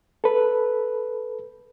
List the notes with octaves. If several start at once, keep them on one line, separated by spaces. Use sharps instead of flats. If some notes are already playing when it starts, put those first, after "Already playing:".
A4 B4